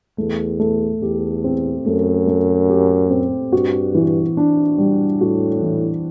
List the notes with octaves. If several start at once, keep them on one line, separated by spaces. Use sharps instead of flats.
E2 A3
A3
E2 G4
C4
F#2 A3
A3
G4
C4
G2 F#4
E3
D4
G3
A2 F#4
E3